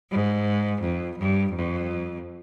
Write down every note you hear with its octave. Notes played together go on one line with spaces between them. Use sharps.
G#2
F2
G2
F2